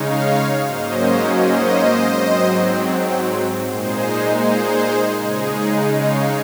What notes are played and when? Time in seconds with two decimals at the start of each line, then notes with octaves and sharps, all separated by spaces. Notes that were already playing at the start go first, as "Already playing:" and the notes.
Already playing: C#3 G#3 D#4 C#5 F5
0.63 G#2 F#3 A#3 C#4 C5 D#5
1.38 C5 D#5
2.14 G#2 F#3 C4
3.65 A#2 G#3 D#4 G#4 C5
4.41 G#4 C5
5.16 C#3 G#3 D#4 G#4
5.92 C#5 F5